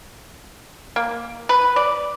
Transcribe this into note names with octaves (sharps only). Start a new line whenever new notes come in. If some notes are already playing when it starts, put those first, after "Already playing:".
A#3
B4
D5